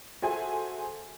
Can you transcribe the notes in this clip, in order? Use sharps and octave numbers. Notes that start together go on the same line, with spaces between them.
F#4 G#4 A4 C5 E5 G#5